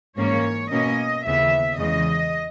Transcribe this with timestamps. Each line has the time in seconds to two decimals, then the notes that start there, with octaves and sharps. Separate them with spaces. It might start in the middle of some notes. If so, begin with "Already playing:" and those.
0.17 G#2 E3 A#3 C#4 C#5
0.71 B2 A#3 C#4 D#5
1.25 D#2 C#3 E3 B3 E5
1.78 E2 C#3 E3 G#3 D#5